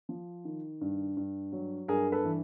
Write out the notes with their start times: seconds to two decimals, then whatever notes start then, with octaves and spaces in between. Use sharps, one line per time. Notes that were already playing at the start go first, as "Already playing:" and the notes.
0.09 F3
0.45 D#3
0.81 G2
1.17 G2
1.52 F#3
1.88 G2 G#4 A#4
2.12 A4 B4
2.24 E3